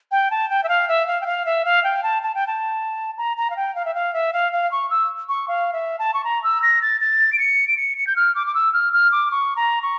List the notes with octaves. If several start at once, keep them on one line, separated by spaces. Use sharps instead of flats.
G5
A5
G5
E5
F5
E5
F5
G5
F5
E5
F5
G5
A5
A5
G5
A5
A#5
A#5
F5
G5
F5
E5
F5
E5
F5
F5
C#6
E6
C#6
F5
E5
A5
C#6
A#5
E6
A#6
A6
A6
D7
C#7
D7
C#7
C#7
G6
F6
D6
D6
E6
F6
F6
D6
C#6
A#5
C#6